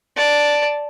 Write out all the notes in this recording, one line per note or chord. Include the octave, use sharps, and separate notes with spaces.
D5 A5